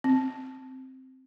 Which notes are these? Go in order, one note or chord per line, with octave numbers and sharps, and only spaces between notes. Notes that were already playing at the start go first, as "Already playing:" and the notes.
C4